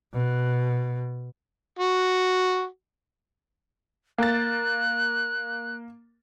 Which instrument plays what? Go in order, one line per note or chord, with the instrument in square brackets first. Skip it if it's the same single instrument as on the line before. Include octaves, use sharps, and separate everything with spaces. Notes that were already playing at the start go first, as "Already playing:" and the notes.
[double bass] B2
[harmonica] F#4
[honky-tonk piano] A#3 A6 [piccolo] F#6